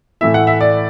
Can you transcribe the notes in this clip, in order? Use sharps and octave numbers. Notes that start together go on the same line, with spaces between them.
A2 E3 A3 E4 E5
F#5
E5
D5